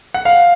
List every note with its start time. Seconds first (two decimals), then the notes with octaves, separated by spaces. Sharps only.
0.14 F#5
0.25 F5